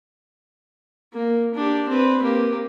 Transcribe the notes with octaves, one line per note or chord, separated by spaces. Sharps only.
A#3
D4 G4
C4 B4
A#3 G4